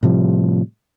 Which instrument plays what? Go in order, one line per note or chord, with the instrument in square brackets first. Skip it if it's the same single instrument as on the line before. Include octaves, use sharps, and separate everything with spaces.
[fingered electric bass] A2 C3 F3 G3